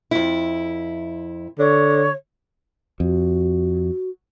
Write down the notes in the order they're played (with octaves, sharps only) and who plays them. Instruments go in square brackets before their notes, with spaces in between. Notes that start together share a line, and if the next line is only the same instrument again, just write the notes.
[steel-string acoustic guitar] F2 E4
[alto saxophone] D3 [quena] C#5
[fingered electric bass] F2 [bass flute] F#4